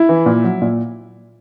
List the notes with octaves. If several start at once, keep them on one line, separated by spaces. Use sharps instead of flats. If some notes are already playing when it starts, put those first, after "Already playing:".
Already playing: E4
E3
A#2
F#3
A#2